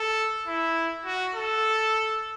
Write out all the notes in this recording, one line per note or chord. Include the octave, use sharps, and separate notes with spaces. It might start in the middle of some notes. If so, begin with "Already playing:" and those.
Already playing: A4
E4
F#4
A4